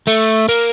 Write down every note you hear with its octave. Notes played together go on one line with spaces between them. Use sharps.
A3
A#3